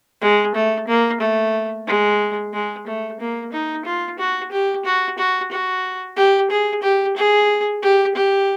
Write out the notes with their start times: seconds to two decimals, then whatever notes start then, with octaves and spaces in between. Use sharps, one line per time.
0.22 G#3
0.55 A3
0.88 A#3
1.21 A3
1.87 G#3
2.53 G#3
2.87 A3
3.20 A#3
3.52 D#4
3.85 F4
4.19 F#4
4.52 G4
4.85 F#4
5.18 F#4
5.52 F#4
6.16 G4
6.50 G#4
6.83 G4
7.17 G#4
7.82 G4
8.15 G4